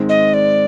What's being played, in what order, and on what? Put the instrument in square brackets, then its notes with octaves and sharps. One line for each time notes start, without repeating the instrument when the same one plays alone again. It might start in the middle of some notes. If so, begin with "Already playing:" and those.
Already playing: [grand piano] G#2 D#3 G#3 C4
[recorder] D#5
D5